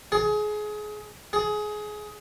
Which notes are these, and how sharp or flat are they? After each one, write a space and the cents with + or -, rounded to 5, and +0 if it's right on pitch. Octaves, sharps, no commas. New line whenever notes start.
G#4 +25
G#4 +20